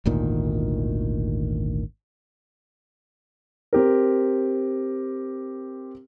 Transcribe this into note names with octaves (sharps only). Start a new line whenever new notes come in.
G#1 D2 A#2 D#3
C4 G4 A#4